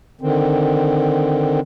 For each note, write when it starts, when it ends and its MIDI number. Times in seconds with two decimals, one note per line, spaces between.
0.21 1.60 50
0.21 1.60 51
0.21 1.60 60